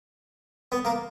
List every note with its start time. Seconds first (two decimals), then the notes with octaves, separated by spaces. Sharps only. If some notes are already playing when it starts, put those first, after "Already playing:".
0.72 B3
0.85 A#3